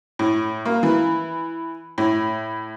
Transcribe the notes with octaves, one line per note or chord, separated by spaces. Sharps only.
A2
A#3
E3
A2